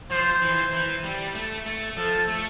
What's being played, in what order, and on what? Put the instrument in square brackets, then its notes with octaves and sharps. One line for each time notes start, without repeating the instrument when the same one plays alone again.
[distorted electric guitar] F3 [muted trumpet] C5
[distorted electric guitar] E3
E3
G3
A3
A3
[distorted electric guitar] F3 [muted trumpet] A4
[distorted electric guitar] A3